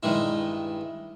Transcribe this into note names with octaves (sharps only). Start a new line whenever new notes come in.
G2 D#3 G#3 E4